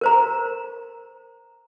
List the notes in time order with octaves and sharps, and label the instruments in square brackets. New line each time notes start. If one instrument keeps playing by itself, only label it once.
[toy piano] A#4 C5 A#5